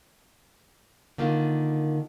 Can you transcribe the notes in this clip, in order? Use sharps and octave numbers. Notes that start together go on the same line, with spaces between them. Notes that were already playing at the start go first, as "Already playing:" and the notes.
D3 D#3 A#3 F4